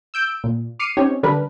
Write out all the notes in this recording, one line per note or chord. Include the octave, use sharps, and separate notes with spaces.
E6 G6 D7
A#2
D6 F6 C7 C#7 D#7
C4 C#4 D#4 G4 C#5
D3 G3 D4 A#4 B4